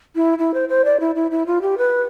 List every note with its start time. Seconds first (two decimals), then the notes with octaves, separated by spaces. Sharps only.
0.16 E4
0.39 E4
0.54 C5
0.69 C5
0.85 D5
1.00 E4
1.15 E4
1.31 E4
1.46 F4
1.62 G4
1.78 B4